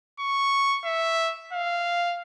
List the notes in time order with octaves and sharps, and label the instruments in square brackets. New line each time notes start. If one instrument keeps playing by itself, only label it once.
[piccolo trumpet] C#6
E5
F5